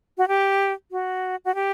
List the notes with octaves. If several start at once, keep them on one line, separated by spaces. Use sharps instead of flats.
F#4
G4
F#4
F#4
G4